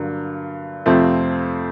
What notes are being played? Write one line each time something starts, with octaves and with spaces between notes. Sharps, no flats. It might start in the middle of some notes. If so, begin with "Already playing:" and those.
Already playing: G2 D3 F#3 A#3
F2 C3 F3 A3 C4